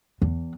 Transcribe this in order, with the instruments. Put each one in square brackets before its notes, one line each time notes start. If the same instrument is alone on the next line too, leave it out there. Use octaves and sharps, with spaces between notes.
[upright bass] E2